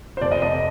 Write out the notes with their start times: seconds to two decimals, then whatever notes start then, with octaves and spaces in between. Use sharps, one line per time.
0.17 C5
0.21 F1 D5
0.32 D#5
0.42 F1 D#5